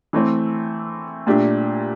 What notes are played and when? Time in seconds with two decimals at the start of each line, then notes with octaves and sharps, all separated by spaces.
0.13 E3 A3 C4
1.27 A#2 A3 D4 G4